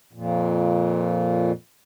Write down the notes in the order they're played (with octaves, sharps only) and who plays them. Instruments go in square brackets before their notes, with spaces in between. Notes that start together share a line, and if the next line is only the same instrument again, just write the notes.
[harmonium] F2 A#2